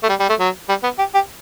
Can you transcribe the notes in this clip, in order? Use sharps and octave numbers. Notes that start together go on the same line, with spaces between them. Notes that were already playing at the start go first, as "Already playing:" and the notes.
A3
G3
G3
A3
F#3
G3
B3
G4
G4